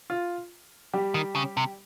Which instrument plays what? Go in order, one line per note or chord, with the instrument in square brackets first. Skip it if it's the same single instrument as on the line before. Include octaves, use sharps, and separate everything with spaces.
[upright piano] F4
G3 G4
[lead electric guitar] D#3
C#3
C3